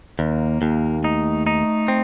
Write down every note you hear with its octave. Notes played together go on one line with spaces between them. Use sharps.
D#2 A#3
D#2
A3 D#4
D#4
C4